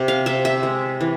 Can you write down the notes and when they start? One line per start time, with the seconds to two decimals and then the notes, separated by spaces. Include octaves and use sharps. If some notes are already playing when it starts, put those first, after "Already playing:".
Already playing: C3
0.08 F5
0.26 C3 E5
0.45 E5
0.63 G#3
1.01 E3